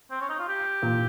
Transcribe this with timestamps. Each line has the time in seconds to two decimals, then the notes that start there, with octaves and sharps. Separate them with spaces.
0.11 C4
0.21 C#4
0.29 D#4
0.39 F4
0.48 G4
0.82 A#2 A#3